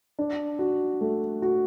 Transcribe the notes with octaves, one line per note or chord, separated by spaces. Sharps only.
D4
F#4
A3
F#4